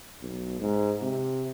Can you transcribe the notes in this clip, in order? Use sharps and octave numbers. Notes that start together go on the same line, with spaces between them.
B1
G#2
C3